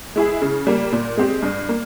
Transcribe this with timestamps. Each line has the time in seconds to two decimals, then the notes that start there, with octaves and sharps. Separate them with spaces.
0.16 G#3 E4 G#4
0.42 C#3
0.67 G3 A#3
0.92 A#2
1.17 G#3 C4 G4
1.43 G2
1.69 A#3